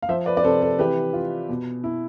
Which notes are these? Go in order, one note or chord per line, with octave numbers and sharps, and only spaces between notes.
F5
F3 C5 E5
B4 D5
D5
C3 A4 C5
A4
E3 G4 B4
F4
B2
E4